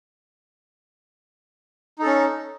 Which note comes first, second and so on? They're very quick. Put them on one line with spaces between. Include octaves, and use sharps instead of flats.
D#4 A4 C#4